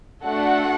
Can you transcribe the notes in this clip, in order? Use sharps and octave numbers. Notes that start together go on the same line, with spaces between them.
A3 D4 F#4 A4 F#5